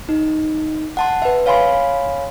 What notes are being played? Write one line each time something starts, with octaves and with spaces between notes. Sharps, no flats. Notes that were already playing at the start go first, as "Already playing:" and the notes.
D#4
F#5 A5 C6
B4 E5
C#5 F5 G#5 B5 C6